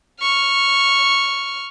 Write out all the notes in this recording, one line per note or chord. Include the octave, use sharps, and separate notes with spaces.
C#6 F6